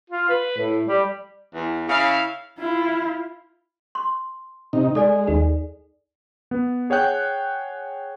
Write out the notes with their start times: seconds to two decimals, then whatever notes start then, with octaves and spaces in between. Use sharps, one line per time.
0.10 F4
0.29 B4
0.57 A2
0.87 G3
1.55 E2
1.89 C#3 E4 F5
2.59 E4 F4
3.95 C6
4.73 C3 D#4
4.95 G#3 A4 D5 G#5
5.27 D#2 D#4 G#4
6.51 B3
6.90 G#4 C#5 F#5 G5 F#6 G6